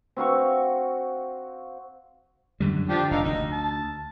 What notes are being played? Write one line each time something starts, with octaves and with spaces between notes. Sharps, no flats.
C4 F#4 F5 C#6
F#2 D3 G3
D3 F3 D4 G4
F1 D3 D#4 F5
D2 D#4
A5